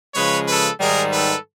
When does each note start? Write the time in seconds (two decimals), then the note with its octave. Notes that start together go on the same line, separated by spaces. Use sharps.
0.15 C#3 F3 G#3 B4 C#5
0.48 A4 B4
0.80 G#2 D#3 G3 G#4 A#4
1.13 A4 B4